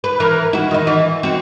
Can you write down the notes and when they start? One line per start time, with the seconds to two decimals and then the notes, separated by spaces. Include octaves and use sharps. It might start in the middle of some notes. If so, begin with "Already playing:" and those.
0.04 B4
0.20 E3 A#4
0.53 E4 F#4
0.71 D#3 D#4
0.87 E3
1.23 C4 F#4